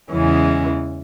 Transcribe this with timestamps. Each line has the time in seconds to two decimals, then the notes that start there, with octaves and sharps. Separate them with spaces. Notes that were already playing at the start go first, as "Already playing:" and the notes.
0.11 E2 C#3 E3 G#3 C#4